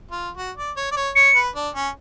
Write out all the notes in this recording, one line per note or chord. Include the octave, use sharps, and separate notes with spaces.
F4
F#4
D5
C#5
D5
C#5
C#5 C#7
B4
D4
C#4